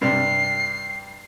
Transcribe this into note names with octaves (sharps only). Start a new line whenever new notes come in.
G2 C3 G3 C7